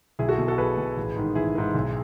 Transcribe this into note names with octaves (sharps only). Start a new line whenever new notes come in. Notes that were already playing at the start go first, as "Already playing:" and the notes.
B1 E4 G#4
F#4 A4
B2
F#4 A4
B1 G#4 B4
B2
A1
G#2 D#3
A1 E4 G#4
G#2 D#3
B1